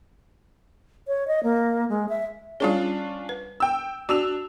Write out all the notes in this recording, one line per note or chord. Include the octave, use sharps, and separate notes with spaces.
C#5
D#5
A#3
G#3
E5
G3 C#4 D4 F4 G#4
B4
G5 E6
D4 F#4 E6 F7